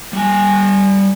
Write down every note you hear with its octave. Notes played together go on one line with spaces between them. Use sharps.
G3 G#5